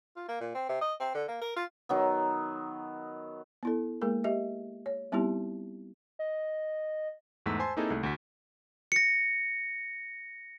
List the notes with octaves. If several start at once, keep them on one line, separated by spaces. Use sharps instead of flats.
F4
A#3
A#2
C4
C3
D#5
C4
D3
A#3
A#4
F4
D#3 F#3 B3
B3 E4 A4
G#3 A#3 G#4 A#4
G4 D#5 E5
C#5
G3 B3 C4 D#4 E4 G4
D#5
E2 G#2 A3 E6 B6
C5 G#5 A5 C6
A#3 C4 D#4 E4 G#4 A4
C2 A3
D2 F#4 B6
A#6 C#7